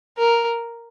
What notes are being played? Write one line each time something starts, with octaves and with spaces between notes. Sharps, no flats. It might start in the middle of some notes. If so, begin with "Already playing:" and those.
A#4